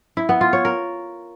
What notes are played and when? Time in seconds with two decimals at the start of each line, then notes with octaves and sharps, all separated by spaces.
0.17 E4
0.29 B3
0.41 F4
0.53 C#5
0.65 A#4